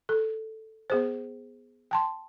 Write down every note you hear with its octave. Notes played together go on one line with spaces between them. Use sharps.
A4
B3 G#4 C5
G5 A5 C6